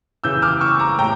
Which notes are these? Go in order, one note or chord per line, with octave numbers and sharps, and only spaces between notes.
C#3 E3 E6 G6
D6 F6
C#6 E6
A#5 D6
A2 G5 A#5